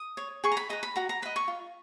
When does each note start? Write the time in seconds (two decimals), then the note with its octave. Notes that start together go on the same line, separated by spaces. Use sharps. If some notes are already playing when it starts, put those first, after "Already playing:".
Already playing: D#6
0.17 C#5
0.44 G#4 C#6
0.52 A#5
0.57 B5
0.69 B4 D#5 A#5
0.83 B5
0.96 F#4 A#5
1.09 A#5
1.22 B4 D#5 B5
1.36 C#6
1.48 F4